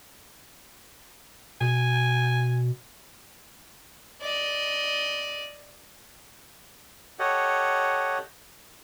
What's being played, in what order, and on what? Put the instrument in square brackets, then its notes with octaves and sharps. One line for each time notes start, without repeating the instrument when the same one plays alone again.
[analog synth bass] B2 [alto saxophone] G#5
[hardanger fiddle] D5 D#5
[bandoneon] G4 A4 C#5 D#5 F#5